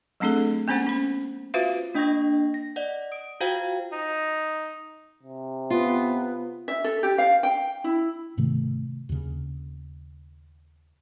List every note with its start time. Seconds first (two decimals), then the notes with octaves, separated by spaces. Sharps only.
0.20 F#3 A3 C4 D4 G#4 A4
0.68 A#3 B3 C#4 C5 F#5
0.87 C#4 B5
1.54 F4 F#4 B4 C5 E5 F5
1.94 A#3 D4 D#5 G5 C#6 A#6
2.54 A#6
2.76 D5 D#5 F#5
3.12 D#6 D7
3.41 F4 F#4 C5 F5 G5 G#6
3.93 D#4
5.23 C3
5.70 B3 F4
6.68 E5
6.84 A4
7.03 G4
7.18 F5
7.43 G5
7.84 E4
8.37 G#2 C3 D#3 A3
9.09 D#2 C#3